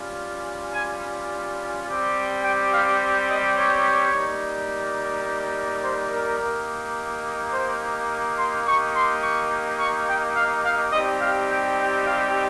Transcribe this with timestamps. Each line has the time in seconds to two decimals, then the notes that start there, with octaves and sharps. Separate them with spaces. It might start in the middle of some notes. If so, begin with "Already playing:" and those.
Already playing: G3 C#4 F4
0.72 G#5
1.85 G3 C4 G4
2.42 G5
2.71 F5
3.28 D#5
3.56 C#5
4.13 G3 A#3 D#4
5.82 C5
6.11 A#4
6.39 A#3 D#4 G4
7.52 C5
8.37 C6
8.66 A#3 D#4 G4 C#6
8.94 C6
9.22 C#6
9.79 C#6
10.07 G5
10.35 F5
10.64 F5
10.92 G3 C4 D#4 G4 D#5
11.20 F5
11.49 G5
11.77 G5
12.05 F5